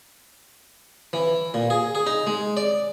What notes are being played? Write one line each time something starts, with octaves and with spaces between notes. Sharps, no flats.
E3
A#2
G#4
G#4
D#4
G#3
D5